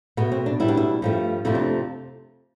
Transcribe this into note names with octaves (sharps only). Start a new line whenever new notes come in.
B2 A3 B3
C4
D4
B2 G3 E4
D4
E4
G2 F3 A3
F2 C3 F3 A3 E4
D4